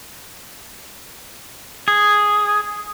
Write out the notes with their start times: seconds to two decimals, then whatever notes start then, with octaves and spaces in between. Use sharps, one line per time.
1.88 G#4